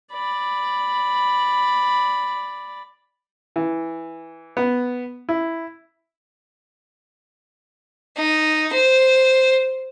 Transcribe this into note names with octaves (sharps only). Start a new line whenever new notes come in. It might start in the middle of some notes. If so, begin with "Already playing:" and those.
D5 B5
E3
B3
E4
D#4
C5